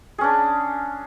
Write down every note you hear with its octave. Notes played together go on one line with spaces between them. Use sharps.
C#4 D4 G#4